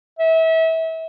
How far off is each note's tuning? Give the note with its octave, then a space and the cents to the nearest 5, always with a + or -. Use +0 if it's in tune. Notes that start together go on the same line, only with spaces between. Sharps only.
E5 -30